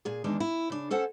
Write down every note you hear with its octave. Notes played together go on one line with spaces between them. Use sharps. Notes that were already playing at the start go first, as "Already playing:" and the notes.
A#2 G#4
E2 D#3 G#3 D4
E4
C#3 D4
C#4 A4 C5 F#5